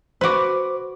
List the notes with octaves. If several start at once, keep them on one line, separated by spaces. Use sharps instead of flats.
F#4 B4 C5 D6